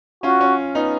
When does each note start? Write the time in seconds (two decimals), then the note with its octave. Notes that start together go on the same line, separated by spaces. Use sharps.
0.23 C#4 F4 F#4
0.41 C#4
0.75 B3 D#4